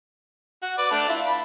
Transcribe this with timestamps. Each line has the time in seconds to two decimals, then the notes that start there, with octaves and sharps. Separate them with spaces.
0.62 F#4
0.78 B4 D5
0.91 A3 D4
1.09 E4 F4
1.26 B5